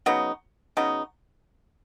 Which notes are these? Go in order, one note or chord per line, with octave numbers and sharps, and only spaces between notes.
C#3 F#3 B3 D#4
C#3 F#3 B3 D#4